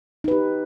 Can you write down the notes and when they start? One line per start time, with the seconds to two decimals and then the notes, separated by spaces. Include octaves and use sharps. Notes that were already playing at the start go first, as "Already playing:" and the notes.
0.24 D#4
0.28 B4
0.31 G4